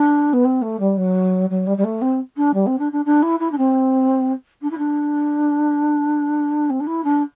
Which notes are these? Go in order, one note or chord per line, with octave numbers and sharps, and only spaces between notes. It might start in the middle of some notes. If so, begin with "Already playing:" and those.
Already playing: D4
B3
C4
A3
G3
F#3
F#3
G3
G3
A3
C4
D4
G3
C4
D4
D4
D4
E4
E4
D4
C4
D4
E4
D4
C4
D4
E4
D4